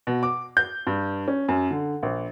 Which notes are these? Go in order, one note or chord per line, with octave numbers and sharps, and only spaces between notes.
B2
D6
G6
G2
C#4
F#2
D3
A#1